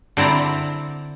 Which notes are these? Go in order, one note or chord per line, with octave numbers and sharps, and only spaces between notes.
D3 C4 E4 D5 A#5